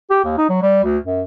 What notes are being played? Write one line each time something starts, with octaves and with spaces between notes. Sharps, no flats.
G4
D#2
D#4
F#3
G3
D2
F#2